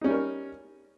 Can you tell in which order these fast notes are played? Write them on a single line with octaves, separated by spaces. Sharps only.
D#4 C#4 G3 A#4 C#5